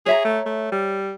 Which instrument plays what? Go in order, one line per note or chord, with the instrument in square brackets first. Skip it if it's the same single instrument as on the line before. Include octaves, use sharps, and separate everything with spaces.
[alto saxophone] G#4 [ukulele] C#5 E5 A#5
[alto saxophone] A3
A3
G3